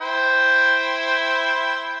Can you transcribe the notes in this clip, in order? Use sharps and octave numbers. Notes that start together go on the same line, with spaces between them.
E4 C5 G5